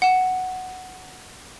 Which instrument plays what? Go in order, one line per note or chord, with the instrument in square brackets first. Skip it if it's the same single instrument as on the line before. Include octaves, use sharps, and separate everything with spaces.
[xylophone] F#5 E7